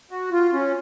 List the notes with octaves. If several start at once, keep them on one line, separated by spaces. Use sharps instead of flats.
F#4
F4
C#4